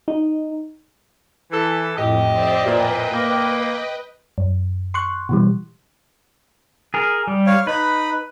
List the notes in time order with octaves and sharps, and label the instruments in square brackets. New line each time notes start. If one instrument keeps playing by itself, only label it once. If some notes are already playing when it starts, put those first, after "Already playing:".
[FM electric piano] D#4
[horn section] E3 A4
[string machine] F2 A2 [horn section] G4 D#5
[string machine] C5 D5 E5
[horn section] A#2 [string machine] B4 D#5 G5
[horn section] A#3
[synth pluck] F#2
C6 C#6 F#6
B2 E3 G3
[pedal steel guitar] G#4 A#4
G3
[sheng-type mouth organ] C#5 F5
[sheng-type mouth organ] D#4 B5 [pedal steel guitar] B4